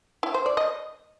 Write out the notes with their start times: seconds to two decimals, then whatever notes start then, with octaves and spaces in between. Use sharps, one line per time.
0.23 E4
0.34 C5
0.46 D5
0.57 D#5